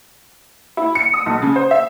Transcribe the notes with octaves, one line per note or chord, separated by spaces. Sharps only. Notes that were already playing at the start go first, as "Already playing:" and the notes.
E4
C#7
D#6
B1
C#3
C5
E5